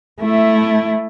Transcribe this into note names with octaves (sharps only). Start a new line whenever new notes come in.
A3 E4